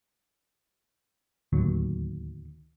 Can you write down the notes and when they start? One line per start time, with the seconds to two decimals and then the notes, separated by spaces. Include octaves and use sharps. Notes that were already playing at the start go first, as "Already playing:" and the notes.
1.53 D1 D#2 F#3